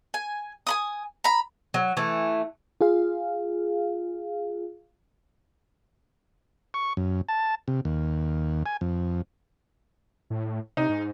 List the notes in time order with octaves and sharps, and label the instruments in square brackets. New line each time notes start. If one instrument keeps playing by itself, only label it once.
[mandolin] G#5
G#5 B5 D#6
A#5 B5
[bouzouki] F#3
E3 A3
[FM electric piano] F4 G#4 F5
[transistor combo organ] C#6
F#2
A5
C3
D#2
G#5
F2
[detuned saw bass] A2
[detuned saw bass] C3 [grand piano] D#4
[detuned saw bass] G#2